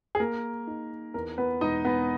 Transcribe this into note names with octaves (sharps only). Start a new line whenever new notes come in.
G#4
A#3 A#4
D#4
E2 A#4
B3 B4
E1 D#4 D#5
B3 B4